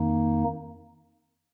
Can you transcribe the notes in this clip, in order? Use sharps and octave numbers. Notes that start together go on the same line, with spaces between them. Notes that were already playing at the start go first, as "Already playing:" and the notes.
Already playing: F2 D#3 A#3 D#4